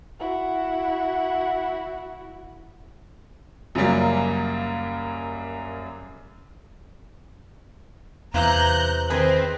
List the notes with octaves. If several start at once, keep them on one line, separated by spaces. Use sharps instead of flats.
E4 F#4
F#2 C#3 F#3 G3 A#3
E2 C3 E3 F5 A#5 F#6 G6
D#3 C4 G#4 B4 C5 D#5